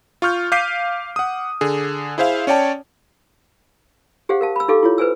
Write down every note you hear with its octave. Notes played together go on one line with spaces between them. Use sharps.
F4 C#6 F6 G6
F5 D6 G6 B6 C7 D#7
F#5 D#6
D3 G#4
E4 G#4 C5 E5 F5
C#4 C#5 D5 G5 A5
G4 G#4 C5 F5 F#5
A#4 F5 A5
B5 E6
D#4 G4 A4 F5 D6
E4 F4 C#5
B4 C5 G#5 E6